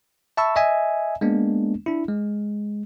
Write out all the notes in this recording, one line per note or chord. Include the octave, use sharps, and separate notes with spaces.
E5 A5 B5 C#6 E6
D#5 E5 G#5
G#3 A#3 B3 D4
D4 E4
G#3